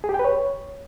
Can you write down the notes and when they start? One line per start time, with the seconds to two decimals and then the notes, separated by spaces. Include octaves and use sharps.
0.04 G#4
0.09 G4
0.14 G5
0.19 B4
0.25 C#5